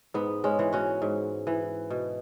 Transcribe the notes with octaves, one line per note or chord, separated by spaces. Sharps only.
G#2 B3
G#3 C#4
E3
C#4 F#4
G#2
E3
B2